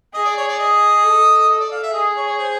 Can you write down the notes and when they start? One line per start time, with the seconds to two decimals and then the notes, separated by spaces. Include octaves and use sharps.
0.14 G#4 D#5
0.25 D5
0.37 C#5
0.48 D5
0.59 D#5
1.04 A4
1.49 D#5
1.60 D5
1.72 F5
1.83 E5
1.93 G#4 D#5
2.16 C#5
2.26 C#5
2.39 C5